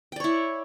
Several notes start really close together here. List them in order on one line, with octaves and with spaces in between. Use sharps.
G5 D5 C#5 E4